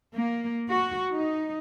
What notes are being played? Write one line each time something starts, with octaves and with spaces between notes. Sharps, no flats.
A#3
F#4
D#4